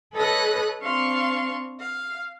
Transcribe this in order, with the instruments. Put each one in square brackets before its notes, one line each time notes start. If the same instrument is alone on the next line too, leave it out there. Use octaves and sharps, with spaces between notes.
[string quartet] A4 B4 C#5 D#5 D#6 F#6
C4 D4 F5 C6 C#6
F5